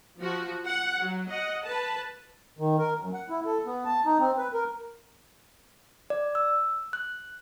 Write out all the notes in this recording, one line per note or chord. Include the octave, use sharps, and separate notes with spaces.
F3 F#4
F#5
F#3
D#5 F#5
B4 A5
D#3
A#4
F#2
F#5
E4
A4
B3
A5
D#4
C4
B4
A#4
D5
E6
F#6